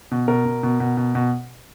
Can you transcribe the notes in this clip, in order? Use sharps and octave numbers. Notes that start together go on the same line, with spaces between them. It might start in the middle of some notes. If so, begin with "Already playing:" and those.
B2
B2 A#4
B2
B2
B2
B2
B2